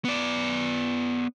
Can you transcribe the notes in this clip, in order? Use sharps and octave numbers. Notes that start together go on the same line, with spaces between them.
B3 D5